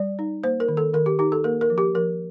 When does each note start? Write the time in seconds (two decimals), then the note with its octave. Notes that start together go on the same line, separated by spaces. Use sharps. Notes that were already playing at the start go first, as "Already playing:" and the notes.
Already playing: G3 D5
0.19 D#4
0.43 A#3 C5
0.60 A#4
0.68 D#3
0.77 A4
0.93 D#3 A#4
1.06 G4
1.19 D#4 G4
1.32 A4
1.44 A#3 A#4
1.61 A#4
1.70 F3
1.78 G4
1.95 F3 A#4